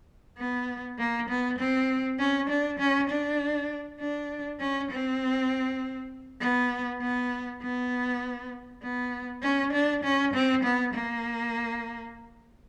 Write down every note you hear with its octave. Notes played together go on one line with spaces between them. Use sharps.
B3
A#3
B3
C4
C#4
D4
C#4
D4
D4
C#4
C4
B3
B3
B3
B3
C#4
D4
C#4
C4
B3
A#3